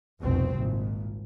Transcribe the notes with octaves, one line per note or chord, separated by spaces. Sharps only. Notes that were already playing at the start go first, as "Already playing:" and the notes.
F1 C2 B2 C4
G#1 A#2